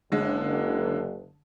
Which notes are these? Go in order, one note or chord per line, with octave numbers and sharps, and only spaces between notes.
F#1 D3 G#3